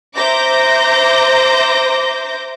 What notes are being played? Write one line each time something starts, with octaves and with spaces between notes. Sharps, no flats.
C5 E5 A#5 D6 G6 A#6